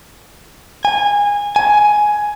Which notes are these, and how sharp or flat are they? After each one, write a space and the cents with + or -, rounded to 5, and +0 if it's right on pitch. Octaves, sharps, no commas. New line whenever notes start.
G#5 -20
G#5 +10